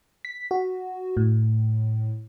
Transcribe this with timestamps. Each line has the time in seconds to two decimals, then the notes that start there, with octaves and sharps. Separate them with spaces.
0.25 B6
0.51 F#4
1.17 A2